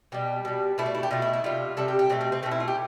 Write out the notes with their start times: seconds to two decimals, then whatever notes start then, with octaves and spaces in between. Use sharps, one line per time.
0.12 B2 G3 G4
0.45 B2 G3
0.78 B2 A3 E4
0.86 D4
0.95 E4
1.03 G4
1.11 B2 A3 F4
1.22 E4
1.33 E4
1.44 C3 G3 F4
1.77 C3 G3 A4
1.88 G4
1.99 G4
2.10 B2 A3 C4
2.21 C4
2.32 C4
2.43 B2 A3 C4
2.51 E4
2.60 F4
2.68 G4